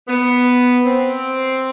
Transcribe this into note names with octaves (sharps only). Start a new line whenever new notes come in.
B3
C4